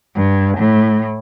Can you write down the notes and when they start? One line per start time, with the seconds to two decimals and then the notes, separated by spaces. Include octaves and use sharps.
0.15 G2
0.58 A2